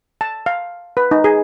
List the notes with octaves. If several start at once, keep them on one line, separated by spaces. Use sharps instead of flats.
A5
F5
B4
D#4
G#4